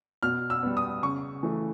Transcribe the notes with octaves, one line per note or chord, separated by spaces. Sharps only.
B2 F6
E6
G3 B3
D#6
C#3 C#6
E3 A3